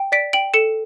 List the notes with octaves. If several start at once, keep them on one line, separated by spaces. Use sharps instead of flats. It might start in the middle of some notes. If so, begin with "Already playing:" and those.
Already playing: G5
D5 B6 D7
G5 D7 F#7
A4 C#7 E7